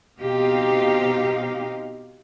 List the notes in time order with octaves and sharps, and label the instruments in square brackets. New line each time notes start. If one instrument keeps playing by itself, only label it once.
[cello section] B2 C4 D#4 G4 D#5 F5